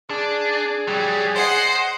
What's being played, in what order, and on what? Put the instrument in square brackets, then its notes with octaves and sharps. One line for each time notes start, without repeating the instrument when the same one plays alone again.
[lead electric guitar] D4 [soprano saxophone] G#4
[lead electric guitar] F#3 G3
[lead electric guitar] C5 [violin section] D#5 F#5 C7